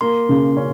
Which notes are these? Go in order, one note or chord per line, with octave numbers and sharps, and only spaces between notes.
A#3 C6
C#3
C#4